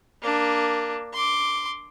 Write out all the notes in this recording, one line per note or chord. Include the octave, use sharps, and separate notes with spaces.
A#3 D4
C6 D6